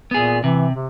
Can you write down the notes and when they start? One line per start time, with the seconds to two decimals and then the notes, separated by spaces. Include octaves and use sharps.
0.11 A#2 B3 G#4
0.44 C3 E3
0.75 C3